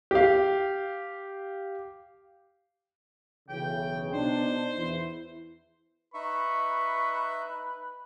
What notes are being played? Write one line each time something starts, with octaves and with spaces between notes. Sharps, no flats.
G4 F5
B1 C#3 E3 G5
B2 D4 D#4 C5
E2 E4
D#4 B4 E5 B5 C#6